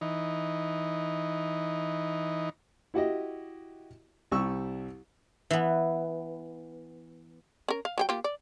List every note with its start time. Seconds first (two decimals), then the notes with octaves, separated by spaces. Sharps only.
0.01 E3 D#4
2.94 E4 F#4 G4 D#5
4.31 C2 G3 C#6 E6
5.51 E3 B3
7.68 C#4 A#4
7.85 F5
7.98 F#3 G4 G5
8.09 A#3 F4 G4
8.24 D5